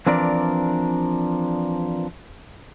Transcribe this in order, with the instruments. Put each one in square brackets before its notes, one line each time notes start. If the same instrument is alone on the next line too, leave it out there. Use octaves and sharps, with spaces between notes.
[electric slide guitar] E3 F3 C4 D4 A#4 D5